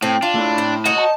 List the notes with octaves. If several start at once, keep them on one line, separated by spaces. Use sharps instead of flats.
A2 C4
D4 F4
A3 E4
C4
D#4 F#4 C#5 D#5
A5